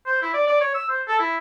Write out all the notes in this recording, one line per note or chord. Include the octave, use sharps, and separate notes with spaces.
C5
E4
D5
D5
C#5
E6
C5
A4
E4